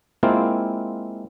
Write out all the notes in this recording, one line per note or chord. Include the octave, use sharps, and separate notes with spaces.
G#3 A#3 C4 E4 F4